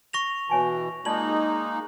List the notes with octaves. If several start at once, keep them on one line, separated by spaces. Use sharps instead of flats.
C#6 A#6 F7
B2 E3 C#5 G#5 A5
G#3 A#3 D#4 F4 D5 A5 F#7
G#4